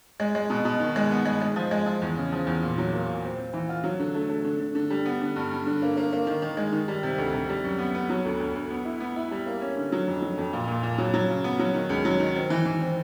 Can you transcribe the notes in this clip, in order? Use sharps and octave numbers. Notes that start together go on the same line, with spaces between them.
G#3
G#3
B2
B2
D#3
G#3
B3
G#3
G#3
F3
G#3
F3
E2
C#3
F3
E2
A#2
F#3
A#3
A#2
C4
C4
E3
F4
F#3
D3
A3
A3
D3
D3
D3
G3
B3
D3
G2
G2
D3
A#3
A#3
A#3
D#3
D#3
G#3
D#3
G3
C3
D2
C3
G3
F#2
B3
B3
F#3
D2
D2
D2
B3
E4
B3
E4
G3
A#3
C#4
D3
F#3
F2
F#3
F2
A#2
A#2
A#2
F#3
F#3
C#3
B3
F#3
D#3
C#2
F#3
D#3
C4
E3
E3
C4